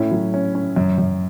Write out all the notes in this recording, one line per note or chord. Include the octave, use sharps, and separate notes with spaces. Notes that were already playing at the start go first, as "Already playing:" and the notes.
Already playing: A2 C#4 E4
F#3
C#4
C#4
F#2
F#2